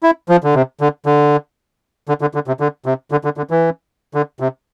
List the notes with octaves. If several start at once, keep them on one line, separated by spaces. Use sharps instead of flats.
E4
F3
D3
C3
D3
D3
D3
D3
D3
C3
D3
C3
D3
D3
D3
E3
D3
C3